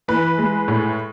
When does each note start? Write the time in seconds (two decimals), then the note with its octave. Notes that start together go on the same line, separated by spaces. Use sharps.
0.08 E3 B4
0.38 G#3
0.68 A2